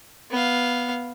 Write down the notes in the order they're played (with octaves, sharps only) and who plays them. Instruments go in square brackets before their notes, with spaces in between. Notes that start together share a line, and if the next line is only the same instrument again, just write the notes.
[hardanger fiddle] B3 F5